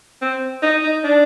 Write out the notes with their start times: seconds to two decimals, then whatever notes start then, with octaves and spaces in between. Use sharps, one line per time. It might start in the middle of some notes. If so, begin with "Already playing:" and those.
0.21 C4
0.62 D#4
0.83 D#4
1.04 D4